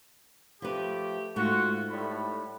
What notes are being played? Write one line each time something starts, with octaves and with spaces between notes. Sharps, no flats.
F3 A3 G4 B4
G#2 A3 F4 F#4
A2 G3 B5